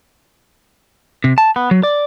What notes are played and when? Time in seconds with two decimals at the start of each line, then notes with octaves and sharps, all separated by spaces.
1.24 C3
1.38 A5
1.56 B3
1.71 F#3
1.83 D5